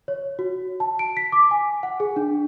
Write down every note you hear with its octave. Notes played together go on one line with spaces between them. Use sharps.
C#5
F#4
A5
D7
B6
D6
G#5
F#5
G#4
D4